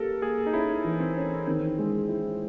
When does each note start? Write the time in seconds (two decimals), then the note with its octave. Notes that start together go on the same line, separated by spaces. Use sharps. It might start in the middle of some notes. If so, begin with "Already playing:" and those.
Already playing: A#3 G4 A4 A#4
0.22 A#3 G#4
0.47 D#4
0.53 C#4 E4
0.84 E3
1.00 C4
1.16 C#4
1.47 D#3 C4
1.79 G#3
2.09 E4